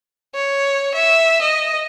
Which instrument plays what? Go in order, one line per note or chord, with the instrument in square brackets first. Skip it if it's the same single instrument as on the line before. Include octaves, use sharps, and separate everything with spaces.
[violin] C#5
E5
D#5